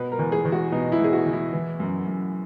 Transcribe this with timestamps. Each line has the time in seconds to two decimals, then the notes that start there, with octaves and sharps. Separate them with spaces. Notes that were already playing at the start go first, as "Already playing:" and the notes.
Already playing: B2 B4
0.12 A#4
0.19 E2
0.32 G#4
0.45 E2
0.52 F#4
0.72 B2 D#4
0.92 E4
1.00 B2 G#4
1.13 F#4
1.26 E2
1.33 E4
1.53 E3
1.80 F#2
2.07 F#2